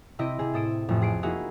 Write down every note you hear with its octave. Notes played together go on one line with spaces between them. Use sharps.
C3 C4 E4 D#5 A#6 D7
C3 G#4
A2 A4 D#6 D7 E7
A1 F2 A2
G#4 C7 D7
A#3 D#4 E4 F#4 G#4